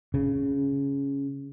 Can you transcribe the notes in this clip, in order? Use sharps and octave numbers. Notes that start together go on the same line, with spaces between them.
C#3